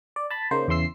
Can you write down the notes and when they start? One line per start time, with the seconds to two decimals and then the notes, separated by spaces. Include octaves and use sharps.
0.16 D5
0.30 A5 B5
0.51 C#3 A#3 D#4 C5
0.68 E2 C#3 E3 C6 E6 C7